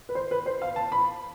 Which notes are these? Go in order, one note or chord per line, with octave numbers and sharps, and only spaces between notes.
B4
C5
B4
C5
F5
A5
B5